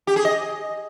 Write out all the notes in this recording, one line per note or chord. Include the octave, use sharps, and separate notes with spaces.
G4
G#4
D#5